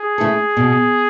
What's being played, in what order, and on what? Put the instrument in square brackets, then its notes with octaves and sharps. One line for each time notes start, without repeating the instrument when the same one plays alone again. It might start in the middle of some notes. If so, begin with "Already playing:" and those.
Already playing: [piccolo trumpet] G#4
[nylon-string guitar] A3 E4 A4
B2